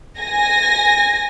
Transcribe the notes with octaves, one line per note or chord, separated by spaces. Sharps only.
G#5 A#6